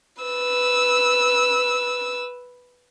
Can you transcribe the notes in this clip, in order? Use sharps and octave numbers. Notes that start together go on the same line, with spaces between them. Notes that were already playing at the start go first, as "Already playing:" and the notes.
B4 E6